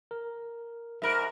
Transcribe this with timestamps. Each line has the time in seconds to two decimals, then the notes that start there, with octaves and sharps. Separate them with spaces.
0.11 A#4
1.02 G#2 A#4 E5 B5 F#6